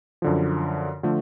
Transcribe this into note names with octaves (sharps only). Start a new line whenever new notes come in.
F#2 D3 F3
D3 F3 A3 F4